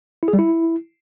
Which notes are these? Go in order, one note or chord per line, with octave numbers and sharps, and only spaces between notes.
E4
G#4
G3
E4